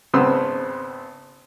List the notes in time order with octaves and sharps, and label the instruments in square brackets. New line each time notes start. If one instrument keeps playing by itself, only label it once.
[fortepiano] G#1 C#3 B3 C4 C6 E6